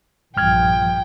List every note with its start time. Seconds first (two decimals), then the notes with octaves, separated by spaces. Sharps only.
0.37 A#1 G2 F3 G5 F6 G#6